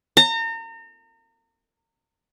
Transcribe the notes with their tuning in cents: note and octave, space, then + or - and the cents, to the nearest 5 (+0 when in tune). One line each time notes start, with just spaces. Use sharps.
A#5 -35